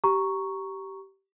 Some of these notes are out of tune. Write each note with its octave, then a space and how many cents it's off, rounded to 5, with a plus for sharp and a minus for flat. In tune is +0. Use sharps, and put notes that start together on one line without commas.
G4 -15 A#5 +0 C#6 +0